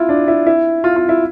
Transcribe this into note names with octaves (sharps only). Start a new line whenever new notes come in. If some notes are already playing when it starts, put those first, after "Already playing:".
Already playing: E4 F4
D4
E4
E4
F4
F4
E4